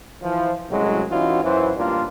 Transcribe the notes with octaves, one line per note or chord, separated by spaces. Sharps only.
E3 F3
C2 F#2 A2 F#3 G#3
E3 C#4 D#4 F4 F#4
F#2 E3 C5
A1 G2 G3 A#3 D4 F4